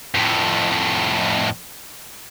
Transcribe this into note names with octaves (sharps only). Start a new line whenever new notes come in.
F2 A2